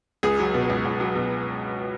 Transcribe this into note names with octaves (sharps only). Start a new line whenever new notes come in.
C#2 G#4
F#3
B2
C#2
C#2
F#3
B2